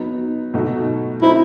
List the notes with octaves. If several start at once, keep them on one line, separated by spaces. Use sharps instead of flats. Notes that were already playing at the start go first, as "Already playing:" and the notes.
Already playing: F#3 B3 D#4
B2 F#3 A3 D#4 F#4
F#3 C4 D#4 E4